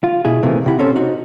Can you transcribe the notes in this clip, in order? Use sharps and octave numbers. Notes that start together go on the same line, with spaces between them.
F4
B2 E4 G#4
C3 D#3 E3 A3 A#3 C4
C3 E4 F#5
C4 C#4 A4 C5
D#4 F#4 C5